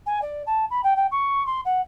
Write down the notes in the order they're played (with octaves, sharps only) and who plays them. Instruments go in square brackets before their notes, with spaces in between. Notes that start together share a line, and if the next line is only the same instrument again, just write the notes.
[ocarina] G#5
D5
A5
B5
G5
G5
C#6
C6
F#5